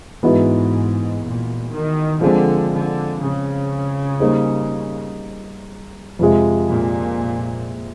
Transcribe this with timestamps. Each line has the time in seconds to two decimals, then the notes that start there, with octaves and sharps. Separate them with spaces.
0.23 G#2 E3 G#3 B3 D#4 F#4
1.23 A#2
1.71 D#3
2.21 D3 F3 G#3 C4
2.72 D3
3.21 C#3
4.20 G3 A#3 D#4 G#4 C5
6.19 F2 C3 F3 G#3
6.69 A#2